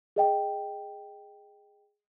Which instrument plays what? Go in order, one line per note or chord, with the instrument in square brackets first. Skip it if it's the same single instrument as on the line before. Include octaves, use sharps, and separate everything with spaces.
[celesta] G#4 D#5 G5